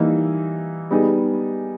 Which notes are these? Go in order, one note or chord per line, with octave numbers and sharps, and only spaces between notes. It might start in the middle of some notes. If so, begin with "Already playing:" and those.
Already playing: E3 G3 A#3 D#4
G3 B3 D#4 G#4